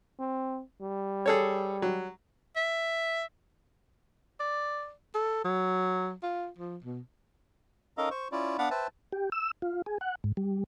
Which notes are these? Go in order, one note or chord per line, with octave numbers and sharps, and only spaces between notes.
C4
G3
G#4 A4 C#5
F#3
E5
D5
A4
F#3
F4
F3
B2
C#4 D#4 A4 A#4 D#5 F5
C5 C#6
C#4 E4 F4 D5
B3 D4 D5 F5 F#5 B5
B4 C5 E5 G5 A5
G4
E6
F4
G#4
F#5
G#2
G3